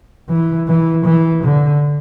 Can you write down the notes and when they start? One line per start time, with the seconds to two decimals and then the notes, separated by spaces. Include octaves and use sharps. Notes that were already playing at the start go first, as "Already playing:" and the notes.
0.29 E3
0.68 E3
1.06 E3
1.44 D3